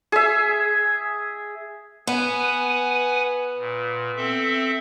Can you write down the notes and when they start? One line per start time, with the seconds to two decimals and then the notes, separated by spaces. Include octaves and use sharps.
0.12 G#4 E5
2.07 B3 B4 F#5 G#5
3.58 A#2
4.16 C4 A4 E5